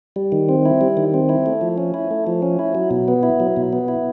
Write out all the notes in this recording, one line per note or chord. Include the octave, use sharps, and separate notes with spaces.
G3
D#3
C4
E4
G3
D#3
C4
E4
A3
F3
C#4
E4
A3
F3
C#4
E4
F#3
B2
B3
E4
F#3
B2
B3
E4